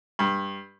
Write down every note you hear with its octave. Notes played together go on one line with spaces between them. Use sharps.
G2